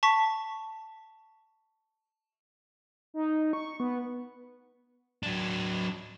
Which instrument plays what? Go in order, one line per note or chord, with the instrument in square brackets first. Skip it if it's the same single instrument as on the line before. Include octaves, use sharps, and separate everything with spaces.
[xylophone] A5 C#6 B6
[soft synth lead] D#4
C#6
B3
[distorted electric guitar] F#3 D4